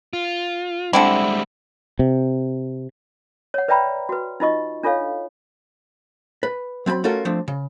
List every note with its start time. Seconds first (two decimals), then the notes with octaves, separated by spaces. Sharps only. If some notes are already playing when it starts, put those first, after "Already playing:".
0.13 F4
0.93 D3 G3 G#3 C4 E4
1.99 C3
3.54 C#5 F#5
3.68 B4 D5 E5 G5 A#5 B5
4.09 F#4 B4
4.40 D#4 F4 D#5 C#6
4.83 D4 F4 A4 C#5 F5
6.43 B4
6.86 F#3 C4 A5 B5
7.04 A3 C#4 F4 F#4 A4 A#4
7.25 F3 A3 C4 D4
7.48 C#3